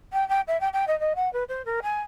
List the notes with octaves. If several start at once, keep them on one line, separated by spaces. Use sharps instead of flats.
G5
G5
E5
G5
G5
D#5
D#5
F#5
B4
C5
A#4
G#5